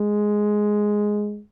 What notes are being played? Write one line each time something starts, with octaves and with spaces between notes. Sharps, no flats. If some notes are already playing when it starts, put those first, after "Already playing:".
Already playing: G#3